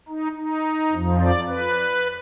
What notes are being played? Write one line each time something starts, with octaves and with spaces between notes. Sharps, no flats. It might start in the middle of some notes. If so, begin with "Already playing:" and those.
D#4
D#4
F2 F3
D5
B4